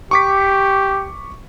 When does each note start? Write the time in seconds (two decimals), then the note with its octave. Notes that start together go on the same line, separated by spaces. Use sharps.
0.11 G4 C#6 D6 B6